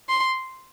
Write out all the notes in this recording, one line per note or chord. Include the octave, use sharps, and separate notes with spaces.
C6